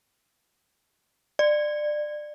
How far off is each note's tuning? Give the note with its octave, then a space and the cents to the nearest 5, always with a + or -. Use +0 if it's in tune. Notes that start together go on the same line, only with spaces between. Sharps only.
D5 +25